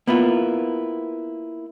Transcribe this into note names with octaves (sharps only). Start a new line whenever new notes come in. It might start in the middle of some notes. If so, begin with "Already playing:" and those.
A#3 B3 E4 F4